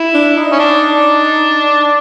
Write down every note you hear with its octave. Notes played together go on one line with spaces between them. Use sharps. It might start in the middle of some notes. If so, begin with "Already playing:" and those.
Already playing: E4
D4
D#4
C#4
D4
D4